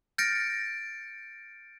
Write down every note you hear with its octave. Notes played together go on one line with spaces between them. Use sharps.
F6 G6 A6 A#6 C#7 D7